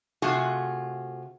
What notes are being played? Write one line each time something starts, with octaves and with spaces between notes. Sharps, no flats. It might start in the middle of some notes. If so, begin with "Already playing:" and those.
C3 A3 F4 F#4 G#4